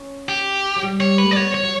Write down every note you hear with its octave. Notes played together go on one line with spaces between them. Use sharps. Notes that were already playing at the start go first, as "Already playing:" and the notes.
Already playing: C#4
G4
F#3
G3
C#5
B4
A3
D5
B3 C#5
C#5
F#3